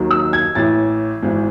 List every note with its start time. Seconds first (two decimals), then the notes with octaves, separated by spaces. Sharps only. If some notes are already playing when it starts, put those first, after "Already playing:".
Already playing: D#2 D#3 F#3
0.11 E6
0.33 G#6
0.55 A1 A2 E3 A6
1.23 G#1 G#2 E3